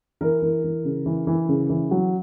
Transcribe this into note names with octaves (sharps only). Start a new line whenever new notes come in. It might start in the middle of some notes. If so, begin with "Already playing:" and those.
E3 A#4
E3
E3
C#3
E3
E3
C#3
E3
F#3